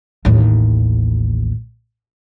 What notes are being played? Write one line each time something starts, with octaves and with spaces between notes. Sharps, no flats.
A1 D#2